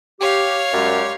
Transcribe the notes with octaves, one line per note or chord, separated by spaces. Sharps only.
G4 C#5 F5
F#2 G3 G#3 G4